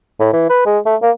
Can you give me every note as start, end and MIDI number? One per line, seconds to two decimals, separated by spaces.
0.20 0.29 45
0.33 0.49 52
0.49 0.64 71
0.66 0.78 56
0.86 0.96 57
1.02 1.11 58